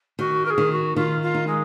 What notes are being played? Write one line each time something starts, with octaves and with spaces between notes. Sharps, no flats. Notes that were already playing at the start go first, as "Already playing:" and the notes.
D#3 F#4
A#4
G#4
D#3
F#4
D#3 F4
F4
D#4
G#3